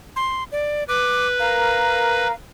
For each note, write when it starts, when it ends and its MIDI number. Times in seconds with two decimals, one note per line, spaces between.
0.16 0.44 84
0.52 0.84 74
0.89 2.28 71
0.89 1.27 86
1.40 2.31 70
1.40 2.35 77